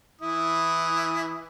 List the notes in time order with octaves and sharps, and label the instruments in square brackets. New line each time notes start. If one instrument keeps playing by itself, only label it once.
[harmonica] E3 E4 D#6